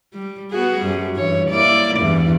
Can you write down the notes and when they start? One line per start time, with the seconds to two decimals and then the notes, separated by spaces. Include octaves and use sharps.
0.14 G3
0.51 B3 F#4 G#4
0.81 F#2 G3
1.15 G2 E3 C#5
1.50 A#3 E4 D5
1.97 E2 G2 E3